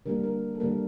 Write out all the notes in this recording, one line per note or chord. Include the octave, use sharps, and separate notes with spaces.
D3 G3 A#3 A#4
A#4
A4
D3 G3 A#3 A#4